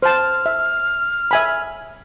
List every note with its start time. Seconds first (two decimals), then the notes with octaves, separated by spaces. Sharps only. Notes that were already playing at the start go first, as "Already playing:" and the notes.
0.03 C5 A5 F6
0.46 E5
1.31 E5 G#5 B5